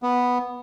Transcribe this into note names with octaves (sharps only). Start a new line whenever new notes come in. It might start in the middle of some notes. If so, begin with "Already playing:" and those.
B3